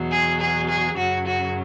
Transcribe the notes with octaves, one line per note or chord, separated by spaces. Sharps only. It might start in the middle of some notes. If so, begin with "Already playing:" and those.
Already playing: E2 B2 F#3
G#4
G#4
G#4
F#2 C#3 F#3 F#4
F#4